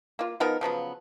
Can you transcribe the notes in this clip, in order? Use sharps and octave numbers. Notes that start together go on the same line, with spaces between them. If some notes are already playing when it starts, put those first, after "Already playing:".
A#3 F4
F3 B3 D#4 A#4
C#3 F3 F#3 B3